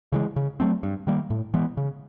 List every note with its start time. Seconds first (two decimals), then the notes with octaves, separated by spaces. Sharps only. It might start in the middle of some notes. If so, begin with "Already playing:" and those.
0.12 C#3 E3 G#3
0.36 C#3
0.60 F#3 A3 C4
0.83 G2
1.07 D#3 G3 A#3
1.30 A2
1.54 E3 G#3 B3
1.77 C#3